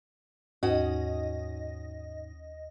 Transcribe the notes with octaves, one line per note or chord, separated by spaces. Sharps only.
D#2 G#2 C#4 F#4 D#5